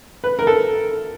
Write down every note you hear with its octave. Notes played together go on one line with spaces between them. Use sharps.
B4
A#4
A4